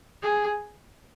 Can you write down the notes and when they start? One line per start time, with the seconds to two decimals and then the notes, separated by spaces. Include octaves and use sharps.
0.23 G#4